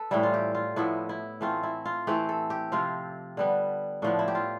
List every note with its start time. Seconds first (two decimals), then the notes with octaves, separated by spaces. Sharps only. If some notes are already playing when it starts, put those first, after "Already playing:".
Already playing: A4 B4
0.11 A2 E3 G3 E4
0.23 F4
0.34 G4
0.55 F4
0.76 A2 F3 B3 E4
1.09 E4
1.41 E3 A3 C4 F4
1.63 E4
1.85 F4
2.07 E3 A3 C4 G4
2.29 A4
2.50 G4
2.72 C3 F3 C4 F4
3.37 D3 G3 B3
4.02 A2 F3 B3 D4
4.19 E4
4.28 G4
4.35 F4